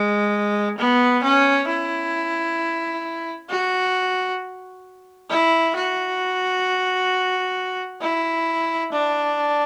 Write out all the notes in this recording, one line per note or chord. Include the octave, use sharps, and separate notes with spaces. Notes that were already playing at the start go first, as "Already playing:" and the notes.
Already playing: G#3
B3
C#4
E4
F#4
E4
F#4
E4
D4